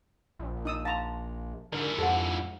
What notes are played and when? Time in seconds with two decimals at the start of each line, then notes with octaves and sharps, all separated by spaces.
0.39 A#1
0.65 D#4 D#6 E6
0.85 F5 A5 A#5 C6 C#6
1.72 G#2 D3 E4 A#4 D5
1.99 F2 G4 A4 C5 F#5